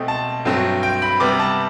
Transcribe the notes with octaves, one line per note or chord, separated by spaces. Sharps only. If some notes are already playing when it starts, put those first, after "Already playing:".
Already playing: B2 A3 C4
A5
G2 F#3 A3 C4
G5
B5
C3 G3 B3 D6
A5